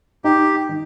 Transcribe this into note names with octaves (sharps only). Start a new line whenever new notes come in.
D#4 G4
D#3